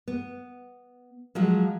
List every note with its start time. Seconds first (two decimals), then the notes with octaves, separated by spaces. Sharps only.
0.08 B3
1.35 F3 F#3 G#3